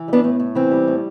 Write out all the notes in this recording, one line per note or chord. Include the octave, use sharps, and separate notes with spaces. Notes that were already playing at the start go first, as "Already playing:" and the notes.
Already playing: E3
G3
B3 D4
A2
A2
E3 C4
G3
A2